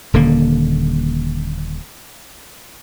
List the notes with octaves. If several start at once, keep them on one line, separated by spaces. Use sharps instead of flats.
D#1 D3 A#3